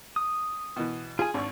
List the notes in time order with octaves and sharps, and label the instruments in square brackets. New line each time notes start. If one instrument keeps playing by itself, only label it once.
[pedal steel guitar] D#6
[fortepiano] B2 E3
[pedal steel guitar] F4 G#5 [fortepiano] G#4
[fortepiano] G#1 C#6 [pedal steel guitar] D4 D5